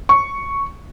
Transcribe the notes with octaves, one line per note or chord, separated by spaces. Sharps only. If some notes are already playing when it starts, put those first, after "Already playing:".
C#6